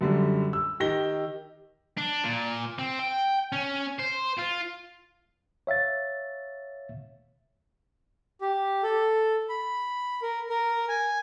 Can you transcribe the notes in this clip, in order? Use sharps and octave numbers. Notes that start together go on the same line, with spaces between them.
F#2 D3 G3
E6
D#3 G4 A#6 G7
D4
A#2
C4
G5
C#4
C5
F4
C#5 E5 F5 A6
G4
A4
B5
A#4
A#4
G#5